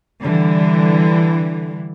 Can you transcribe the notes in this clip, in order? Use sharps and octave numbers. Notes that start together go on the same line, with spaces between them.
D3 E3 G3